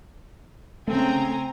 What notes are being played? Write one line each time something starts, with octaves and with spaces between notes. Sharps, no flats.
C#3 A3 C4 G#5 A#5